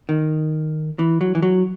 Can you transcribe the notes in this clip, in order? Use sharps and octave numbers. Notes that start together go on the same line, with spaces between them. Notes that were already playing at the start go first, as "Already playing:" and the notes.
D#3
E3
F#3
E3
F#3